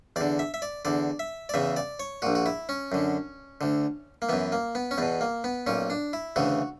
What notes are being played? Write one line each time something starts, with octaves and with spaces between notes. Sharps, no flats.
E2 D3 D5
E5
E5
D5
E2 D3 D5
E5
D5
E2 C#3 E3 E5
D5
C#5
A#1 A#2 F#4
F#4
E4
C#4
F#2 D3
D2 D3
A#3
F#2 E3 B3
A#3
B3
C#4
E2 B2 B3
A#3
B3
B1 A#2 C#4
D4
E4
D2 C#3 E3 F#4